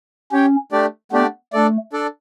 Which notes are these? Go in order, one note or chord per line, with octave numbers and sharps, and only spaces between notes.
C#4 G4 C#5 G5
A3 D4 G4 D5
A3 B3 D4 G4 D5
A3 D4 A4 D5
D4 A4 D5